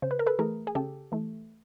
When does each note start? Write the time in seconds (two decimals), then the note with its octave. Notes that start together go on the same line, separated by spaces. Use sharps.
0.02 C#3 C5
0.11 B4
0.19 A#4
0.26 A4 B4
0.39 E3 A3 G#4 A#4
0.67 G#4
0.75 C#3 G4 A4
1.12 E3 A3